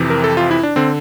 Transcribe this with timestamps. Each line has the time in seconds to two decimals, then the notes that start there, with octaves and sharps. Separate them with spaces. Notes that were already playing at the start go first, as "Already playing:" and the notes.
Already playing: F2 C3 E3
0.10 A#4
0.24 A4
0.37 F4
0.51 E4
0.63 D4
0.76 D3 C4